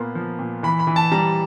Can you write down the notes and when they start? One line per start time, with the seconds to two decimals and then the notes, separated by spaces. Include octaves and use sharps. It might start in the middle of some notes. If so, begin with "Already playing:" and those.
Already playing: A#2 A#3 B3 C6
0.15 F3
0.39 A#2
0.63 E3 B5
0.79 B5
0.87 E3
0.96 A5
1.11 G3 A#5